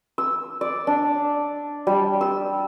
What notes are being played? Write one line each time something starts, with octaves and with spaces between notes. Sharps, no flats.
E6
D5
D4
G3
E6